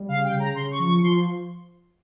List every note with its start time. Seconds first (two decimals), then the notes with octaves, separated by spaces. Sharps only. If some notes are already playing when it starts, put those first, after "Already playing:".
Already playing: G3
0.09 C#3 F5
0.24 G5
0.32 C#3
0.40 A#5
0.55 C#3 C6
0.71 C#6
0.79 F3
0.86 C#6
1.03 F3 C6